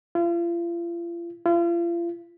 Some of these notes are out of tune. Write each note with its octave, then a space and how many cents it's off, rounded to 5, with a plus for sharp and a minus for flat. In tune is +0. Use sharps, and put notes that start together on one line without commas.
F4 -40
F4 -40